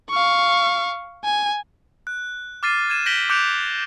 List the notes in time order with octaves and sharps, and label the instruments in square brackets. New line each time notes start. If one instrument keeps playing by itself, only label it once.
[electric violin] F5 C#6
G#5
[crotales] F#6
D6 F6 A6 C7 D#7
G#6 D#7 E7
G6 A#6 B6 D7 F#7 G7
D6 F#6 G6 C#7 D7 F7